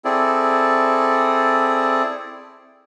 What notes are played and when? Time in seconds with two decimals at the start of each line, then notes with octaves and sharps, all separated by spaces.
0.05 C4 E4 G#4 A4 D5